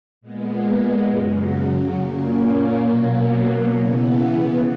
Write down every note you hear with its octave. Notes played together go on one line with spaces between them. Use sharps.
A#2 G#3 B3
F#2 C#3 F#3
A#2 A#3 C#4
B2 F#3 A#3
C#3 E3 B3